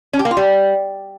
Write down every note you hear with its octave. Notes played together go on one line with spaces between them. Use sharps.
C#4
G4
A#3
F4
G3